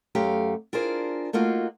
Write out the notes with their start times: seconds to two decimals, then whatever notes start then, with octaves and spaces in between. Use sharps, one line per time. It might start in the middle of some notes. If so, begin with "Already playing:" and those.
0.15 F#2 A3 G4 F5 A#5
0.73 D4 F4 G#4 A#4 C5
1.33 A3 A#3 D#4 F4 F#4